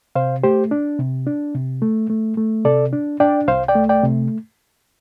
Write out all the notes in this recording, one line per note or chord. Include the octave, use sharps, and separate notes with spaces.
C3 C5 F5
A3 G4 C5
D4
C3
D4
C3
A3
A3
A3
C3 A4 D5
D4
D4 D5 G5
C2 C5 F5
D5 G5
A3
D5 G5
C3